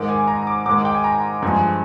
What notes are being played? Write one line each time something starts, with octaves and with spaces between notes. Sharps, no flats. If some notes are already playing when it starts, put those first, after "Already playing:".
Already playing: G#2 D#3 G#3 D6
G#5
A#5
D6
G#2 D#3 G#3 D6
G5
G#5
A#5
G2 F3 G#3 G#5